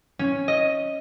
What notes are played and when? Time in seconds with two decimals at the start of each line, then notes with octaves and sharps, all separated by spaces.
0.19 C#4
0.48 D#5